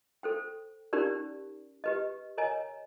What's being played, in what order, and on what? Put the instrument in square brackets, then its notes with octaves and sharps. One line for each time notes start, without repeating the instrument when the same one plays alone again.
[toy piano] A4 C5 G5
C#4 D#4 G4 A#4 D5
G4 B4 D#5
A#4 C#5 D#5 G#5 A#5